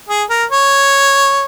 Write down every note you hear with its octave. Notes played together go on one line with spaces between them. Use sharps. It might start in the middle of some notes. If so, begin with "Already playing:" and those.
G#4
A#4
C#5